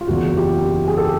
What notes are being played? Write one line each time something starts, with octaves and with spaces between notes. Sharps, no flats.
F4
F#1 E2 C#3 F#4
F4 G4
G#4
G4 A4